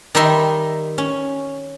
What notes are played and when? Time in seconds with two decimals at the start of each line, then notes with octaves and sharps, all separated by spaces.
0.15 D#3 G3 D#4 E5 C6
0.98 C#4